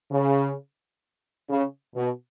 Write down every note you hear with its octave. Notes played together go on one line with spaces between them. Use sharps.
C#3
C#3
B2